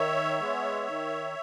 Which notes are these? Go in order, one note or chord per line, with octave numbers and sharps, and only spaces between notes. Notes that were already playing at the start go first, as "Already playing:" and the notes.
Already playing: D#3 C#5 E5
G#3 B3
D#3